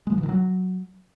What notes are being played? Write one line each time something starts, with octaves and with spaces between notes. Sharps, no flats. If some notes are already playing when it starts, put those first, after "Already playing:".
G#3
F3
E3
D#3
F#3